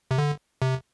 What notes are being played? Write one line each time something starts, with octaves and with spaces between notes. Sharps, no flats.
C3
D3
C3